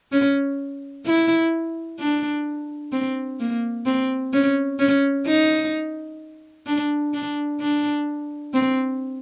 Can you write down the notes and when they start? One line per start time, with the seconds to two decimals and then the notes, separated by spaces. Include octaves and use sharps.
0.12 C#4
1.06 E4
1.99 D4
2.92 C4
3.40 A#3
3.86 C4
4.33 C#4
4.80 C#4
5.27 D#4
6.66 D4
7.14 D4
7.60 D4
8.54 C4